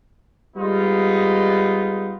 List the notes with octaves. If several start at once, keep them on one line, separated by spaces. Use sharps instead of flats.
G3 G#3 B3 D#4 F4